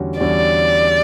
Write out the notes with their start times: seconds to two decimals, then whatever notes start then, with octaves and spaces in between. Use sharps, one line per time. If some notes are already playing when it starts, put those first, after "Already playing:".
Already playing: E2 D3 G3 C#4 F#4
0.20 E2 D3 G3 C#4 F#4 D5